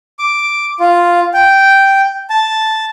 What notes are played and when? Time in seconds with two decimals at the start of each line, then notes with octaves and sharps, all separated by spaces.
0.19 D6
0.80 F4
1.34 G5
2.30 A5